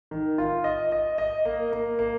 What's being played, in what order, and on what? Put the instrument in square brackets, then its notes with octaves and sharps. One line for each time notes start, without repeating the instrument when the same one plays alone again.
[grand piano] D#3
F4
D#5
D#5
D#5
A#3
A#3
A#3